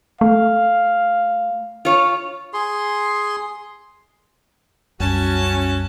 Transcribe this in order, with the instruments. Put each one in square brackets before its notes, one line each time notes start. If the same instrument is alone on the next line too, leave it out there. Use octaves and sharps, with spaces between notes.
[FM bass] A3 [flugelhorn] F5
[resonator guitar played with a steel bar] F4 C#5
[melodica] G#4 C6
[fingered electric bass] C2 F#2 G3 [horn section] C#4 F#4 [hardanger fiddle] A5